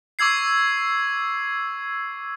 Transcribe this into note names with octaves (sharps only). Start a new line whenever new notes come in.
C#6 D6 E6 G#6 C7